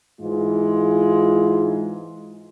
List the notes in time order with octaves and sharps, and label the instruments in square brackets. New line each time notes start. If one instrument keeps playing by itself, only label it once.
[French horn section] G#2 E3 G#3 F4